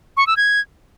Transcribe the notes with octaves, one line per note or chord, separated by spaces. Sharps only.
C#6
E6
G#6